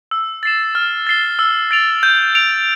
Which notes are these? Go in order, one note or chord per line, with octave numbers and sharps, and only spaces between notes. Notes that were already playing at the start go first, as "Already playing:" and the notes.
E6
A6 C7 E7
F6
A6 C7 G7
E6
A6 D7 F7
G6
D7 F7